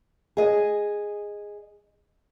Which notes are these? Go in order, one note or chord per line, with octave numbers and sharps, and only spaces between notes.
G#4 D#5